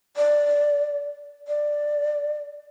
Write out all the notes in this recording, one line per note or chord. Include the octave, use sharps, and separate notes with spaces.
D5
D5